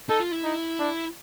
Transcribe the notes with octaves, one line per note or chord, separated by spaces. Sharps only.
D#4 A4
F4
E4
D#4
D4